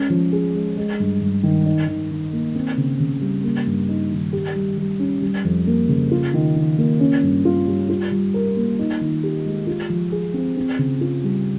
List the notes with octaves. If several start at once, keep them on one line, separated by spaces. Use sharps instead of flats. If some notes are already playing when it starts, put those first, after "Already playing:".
Already playing: G#3 C#4
F3
G#4
G#3
G#3
G2
G2
D#3
D#4
D#3
D#3
A#3
C4
C#3
C#3
G3
A#3
G2
D#4
D#3
G4
G3
G3
C#4
G3
F2
A#3
C#3
F4
D#3
D#3
A#3
C#4
G2
F4
G3
F4
G3
A#4
A#3
D#4
D#3
G4
G#3
F4
F3
G#4
C4
C4
C#3
F4
G3